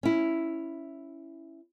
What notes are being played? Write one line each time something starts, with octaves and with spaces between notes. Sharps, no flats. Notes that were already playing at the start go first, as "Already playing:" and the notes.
C#4 E4